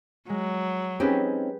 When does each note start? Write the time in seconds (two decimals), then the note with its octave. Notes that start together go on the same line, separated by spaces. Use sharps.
0.29 F#3 G#3
1.00 C4 C#4 D#4 G4 G#4 B4